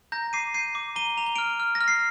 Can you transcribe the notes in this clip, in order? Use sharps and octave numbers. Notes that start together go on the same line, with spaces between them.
A#5 G6 A#6
D6 C7 D#7
G6 C7 D#7
D6
A#5 D#7 G7
A#5 F7
G7
F6 D7 F7
F6
A#6
F6
C7